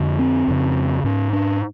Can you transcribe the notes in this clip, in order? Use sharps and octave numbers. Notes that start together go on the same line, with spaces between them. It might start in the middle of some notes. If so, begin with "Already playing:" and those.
Already playing: F2 D3
C4
F2 C#3
G#2 C#4
D4